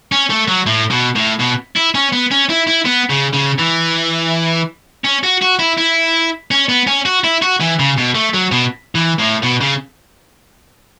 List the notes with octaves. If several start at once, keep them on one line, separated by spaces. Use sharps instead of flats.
C#4
A3
F#3
A2
B2
A2
B2
E4
C#4
B3
C#4
E4
E4
B3
C#3
C#3
E3
C#4
F#4
F#4
E4
E4
C#4
B3
C#4
F#4
E4
F#4
E3
C#3
B2
A3
F#3
B2
E3
A2
B2
C#3